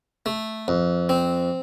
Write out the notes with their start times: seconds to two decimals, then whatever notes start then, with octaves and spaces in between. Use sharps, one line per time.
0.26 A3
0.68 F2
1.09 C4